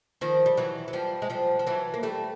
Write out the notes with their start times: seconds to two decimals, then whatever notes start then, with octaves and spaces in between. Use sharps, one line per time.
0.21 D#3 F3
0.46 G3
0.57 E3 F#3
0.88 F#3
0.93 F3 G3
1.22 G#3
1.30 F3 G3
1.59 F3
1.66 E3 F#3
1.94 A#3
2.03 G3 A3